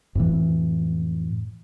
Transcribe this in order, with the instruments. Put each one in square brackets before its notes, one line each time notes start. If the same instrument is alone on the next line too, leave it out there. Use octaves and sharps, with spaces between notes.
[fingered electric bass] F2 A2 E3